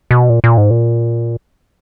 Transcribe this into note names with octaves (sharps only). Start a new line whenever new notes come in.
B2
A#2
A#2
G#2
A#2